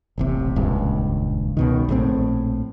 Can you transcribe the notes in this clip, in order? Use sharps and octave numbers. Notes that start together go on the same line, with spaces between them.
D#1 A1 C3
D#1 C#2 G2
C#2 B2 D#3
A#1 A2 D#3 C4